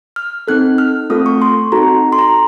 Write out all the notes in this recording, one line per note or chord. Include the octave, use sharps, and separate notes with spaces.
F6
C4 D#4 A4 F#6
F6
A3 C4 F4 A4 D#6
C#6
C6
C4 D#4 F#4 A4 A#5
C6
A#5